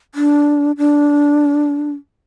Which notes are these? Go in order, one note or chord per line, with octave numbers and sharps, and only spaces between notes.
D4
D4